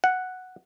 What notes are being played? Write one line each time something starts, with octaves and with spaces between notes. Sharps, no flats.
F#5